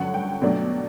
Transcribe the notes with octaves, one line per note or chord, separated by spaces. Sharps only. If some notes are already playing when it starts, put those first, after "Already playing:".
Already playing: G2 D3 F#3 C#4 F#5
G5
B2 F#3 A3 D4